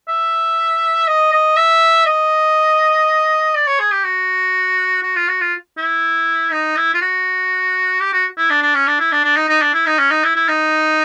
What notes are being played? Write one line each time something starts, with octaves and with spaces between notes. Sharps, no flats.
E5
D#5
D#5
E5
D#5
D5
C#5
G#4
G4
F#4
F#4
F4
F#4
F4
E4
D#4
E4
F4
F#4
G4
F#4
E4
D4
D4
C#4
D4
E4
D4
D4
D#4
D#4
D4
E4
D#4
C#4
D#4
E4
E4
D#4